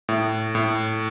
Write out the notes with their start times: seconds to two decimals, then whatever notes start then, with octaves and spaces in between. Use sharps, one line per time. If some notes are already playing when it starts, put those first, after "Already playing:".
0.09 A2
0.55 A2